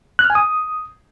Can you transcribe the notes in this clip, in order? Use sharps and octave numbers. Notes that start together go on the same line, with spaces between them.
F#6
F6
G#5
D#6